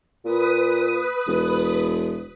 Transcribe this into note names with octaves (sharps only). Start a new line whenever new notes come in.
A#2 B4 D#6
E1